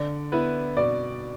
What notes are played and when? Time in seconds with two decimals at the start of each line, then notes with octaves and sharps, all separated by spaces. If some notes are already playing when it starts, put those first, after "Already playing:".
Already playing: D3 D5
0.32 B3 E4 B4
0.77 B2 D5